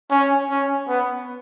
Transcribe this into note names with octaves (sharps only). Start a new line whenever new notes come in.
C#4
C#4
B3